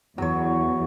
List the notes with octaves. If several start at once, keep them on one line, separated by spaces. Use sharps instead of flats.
E2 F#3 C#5